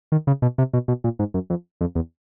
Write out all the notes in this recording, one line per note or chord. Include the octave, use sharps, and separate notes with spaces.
D#3
C#3
B2
C3
B2
B2
A#2
G#2
F#2
F2
F2
E2